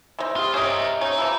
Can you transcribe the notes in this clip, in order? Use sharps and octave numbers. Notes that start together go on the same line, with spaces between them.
E3 D#4 C5
F4 G4 D#5 F5
C#4 A#4 C5 D#5 E5 D6 D#6
A#5
C#4 D#4
E3 F3 E4